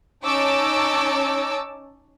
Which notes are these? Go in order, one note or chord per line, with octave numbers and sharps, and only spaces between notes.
C#4 D#4 C#5 A5 D6 E6